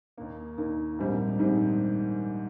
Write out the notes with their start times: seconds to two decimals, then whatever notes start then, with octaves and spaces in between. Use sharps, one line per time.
0.17 D#2 D#3 A#3
0.58 D#2 D#3 A#3
0.98 A#1 G#2 D#3 G3 C4
1.39 A#1 G#2 D#3 G3 C4